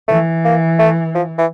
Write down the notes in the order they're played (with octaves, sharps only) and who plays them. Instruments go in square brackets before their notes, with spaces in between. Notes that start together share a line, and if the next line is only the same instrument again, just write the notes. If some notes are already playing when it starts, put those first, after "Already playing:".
[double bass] E3 [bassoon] A3
[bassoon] A#3
A3
F3
E3